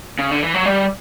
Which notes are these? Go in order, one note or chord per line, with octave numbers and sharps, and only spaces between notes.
C#3
D3
E3
F#3
G3